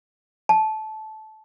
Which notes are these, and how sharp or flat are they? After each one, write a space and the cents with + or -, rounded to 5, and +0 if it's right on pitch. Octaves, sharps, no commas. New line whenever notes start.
A5 -20